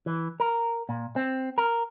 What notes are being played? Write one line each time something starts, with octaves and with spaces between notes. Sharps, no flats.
E3
A#4
A#2
C4
A#4